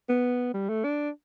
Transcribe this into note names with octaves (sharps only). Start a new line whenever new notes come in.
B3
G3
A3
D4